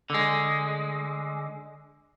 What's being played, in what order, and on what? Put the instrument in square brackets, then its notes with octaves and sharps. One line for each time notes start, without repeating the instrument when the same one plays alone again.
[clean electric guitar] D3 G#3